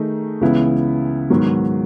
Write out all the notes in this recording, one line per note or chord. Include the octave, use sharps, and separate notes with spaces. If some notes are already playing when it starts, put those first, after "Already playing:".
Already playing: D#3 A3 D#4 G#4
C#2 C#3 E3 B3 E4
G#2 D#3 F#3 B3